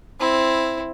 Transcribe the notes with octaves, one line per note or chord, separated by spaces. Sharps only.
C4 E4